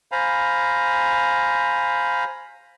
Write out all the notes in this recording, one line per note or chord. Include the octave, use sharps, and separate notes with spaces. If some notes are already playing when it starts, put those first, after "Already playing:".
C5 F5 G#5 A#5 B5